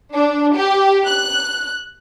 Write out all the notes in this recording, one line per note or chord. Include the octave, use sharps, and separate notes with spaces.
D4
G4
F#6